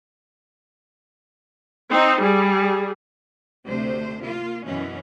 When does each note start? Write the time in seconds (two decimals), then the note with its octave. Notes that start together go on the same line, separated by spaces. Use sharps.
1.89 C4 D#4
2.21 G3 G#4
3.65 D2 C3 A3 C5
4.22 A#3 F4
4.65 F#2 B2 E3 C#4